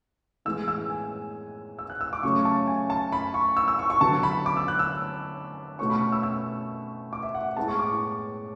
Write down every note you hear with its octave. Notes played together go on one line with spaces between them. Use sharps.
A2 E3 G#3 B3 E6
E6
G#5
E6
F#6
E6
D6
C#3 F#3 A3 C#4 C#6
A5
G#5
A5
B5
C#6
E6
E6
C#6
C#6
D3 F#3 B3 A5
B5
D6
E6
F#6
E6
B2 A3 C#4 C#6
B5
E6
E6
D6
E5
F#5
A2 G#3 B3 A5
C#6
D6